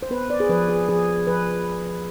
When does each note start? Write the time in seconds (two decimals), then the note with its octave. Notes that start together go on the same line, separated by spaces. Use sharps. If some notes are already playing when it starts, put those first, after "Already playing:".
0.03 C5
0.10 B3 B4
0.30 D5
0.40 G#4
0.49 F3 B4
0.69 G#4
0.89 F3 G#4
1.27 F3 B4